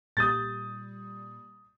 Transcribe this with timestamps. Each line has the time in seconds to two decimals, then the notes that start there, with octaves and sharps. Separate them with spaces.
0.17 A#2 G3 D#6 G6 A6